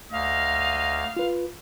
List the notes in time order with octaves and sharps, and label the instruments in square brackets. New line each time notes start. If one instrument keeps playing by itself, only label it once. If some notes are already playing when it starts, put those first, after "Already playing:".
[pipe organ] D2 [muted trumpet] D#5 [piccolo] F5
[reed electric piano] F4 B4